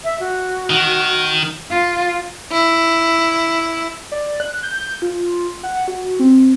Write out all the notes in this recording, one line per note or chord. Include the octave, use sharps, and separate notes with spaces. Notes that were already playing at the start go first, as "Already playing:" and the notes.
E5
F#4
D#3
F4
E4
D5
F#6
G6
F4
F#5
F#4
C4